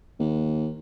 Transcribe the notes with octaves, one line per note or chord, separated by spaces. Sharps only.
D#2